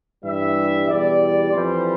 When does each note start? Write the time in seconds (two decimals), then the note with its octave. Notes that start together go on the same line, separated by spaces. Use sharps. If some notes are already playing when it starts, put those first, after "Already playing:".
0.24 G2 E3 G3 E5
0.88 E2 B2 G3 D5
1.51 F2 E3 G3 C5